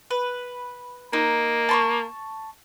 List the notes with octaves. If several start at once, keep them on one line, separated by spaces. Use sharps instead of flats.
B4
A#3 D#4
A5 C6 C#6